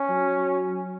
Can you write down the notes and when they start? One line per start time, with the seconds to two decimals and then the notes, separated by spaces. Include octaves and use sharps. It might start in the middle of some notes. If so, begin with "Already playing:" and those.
Already playing: C#4
0.09 F#3